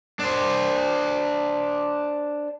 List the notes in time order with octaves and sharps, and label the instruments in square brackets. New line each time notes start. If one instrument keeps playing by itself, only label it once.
[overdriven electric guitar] D4 C5